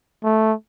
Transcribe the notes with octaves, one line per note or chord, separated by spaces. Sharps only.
A3